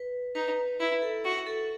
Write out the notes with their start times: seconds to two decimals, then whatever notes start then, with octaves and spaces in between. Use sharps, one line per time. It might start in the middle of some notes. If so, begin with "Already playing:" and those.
Already playing: B4
0.35 D#4 B4
0.80 E4 B4
1.02 A4
1.25 F#4
1.46 A4